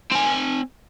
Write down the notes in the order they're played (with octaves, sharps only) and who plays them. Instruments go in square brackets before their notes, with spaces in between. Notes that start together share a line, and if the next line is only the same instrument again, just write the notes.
[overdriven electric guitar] C4 G#5